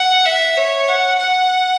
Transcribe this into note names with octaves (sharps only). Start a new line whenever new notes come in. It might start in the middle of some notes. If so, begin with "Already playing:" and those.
Already playing: F#5
E5
C#5
F#5
F#5